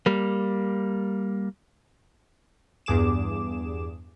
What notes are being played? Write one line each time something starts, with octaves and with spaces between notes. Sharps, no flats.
G3 A#3
E2 G2 G#4 D6 E7